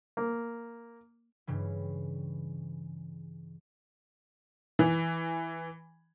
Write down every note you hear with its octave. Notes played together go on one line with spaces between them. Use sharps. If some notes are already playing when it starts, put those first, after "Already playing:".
A#3
G2 C#3 E3
E3